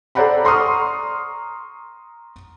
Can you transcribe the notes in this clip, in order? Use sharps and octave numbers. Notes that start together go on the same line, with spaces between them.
A4 C5 D5 F#5 A#5 B5
A#5 C6 C#6 D#6 F6